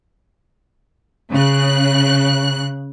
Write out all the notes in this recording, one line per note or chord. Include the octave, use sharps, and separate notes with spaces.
C#3 F#6